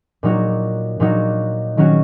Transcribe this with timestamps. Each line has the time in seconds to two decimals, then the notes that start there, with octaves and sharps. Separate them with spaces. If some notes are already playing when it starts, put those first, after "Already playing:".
0.23 A#2 F#3 D#4 F#4
1.00 A#2 F#3 D#4 F#4
1.77 D#3 F#3 C#4 F#4